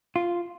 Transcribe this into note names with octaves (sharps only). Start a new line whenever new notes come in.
F4